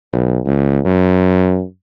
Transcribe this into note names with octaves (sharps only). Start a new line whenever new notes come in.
B1
C#2
F#2